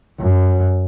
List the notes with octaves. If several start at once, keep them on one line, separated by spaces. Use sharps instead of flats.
F#2